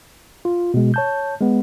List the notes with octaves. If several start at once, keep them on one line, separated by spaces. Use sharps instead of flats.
F4
B2 G#3
C#5 A5 G6
G#3 B3